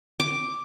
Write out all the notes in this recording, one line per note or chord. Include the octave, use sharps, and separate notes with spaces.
D6